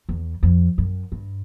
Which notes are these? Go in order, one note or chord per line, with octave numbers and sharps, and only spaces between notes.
E2
F2
F#2
G2